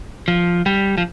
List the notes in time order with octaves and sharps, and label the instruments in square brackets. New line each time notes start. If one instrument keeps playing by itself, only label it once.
[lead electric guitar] F3
G3
F3